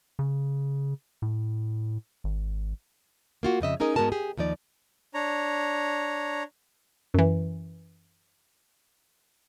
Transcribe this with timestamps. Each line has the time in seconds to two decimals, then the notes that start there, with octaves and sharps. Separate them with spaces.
0.19 C#3
1.22 A2
2.24 G#1
3.43 A#3 F4 F#4
3.61 F2 C#3 D#5 E5
3.80 C#4 D#4 G#4 A#4 D#5
3.96 G#2 G#3 B3 F#4 A#4 A5
4.12 G4 G#4
4.37 D#2 F3 D#4 D5
5.14 D4 C#5 A#5
7.14 F#2 E3